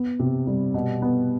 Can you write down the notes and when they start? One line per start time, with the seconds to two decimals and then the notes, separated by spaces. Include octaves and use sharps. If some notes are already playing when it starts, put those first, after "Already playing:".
Already playing: B3
0.19 C3
0.47 G3
0.74 B2
1.02 B3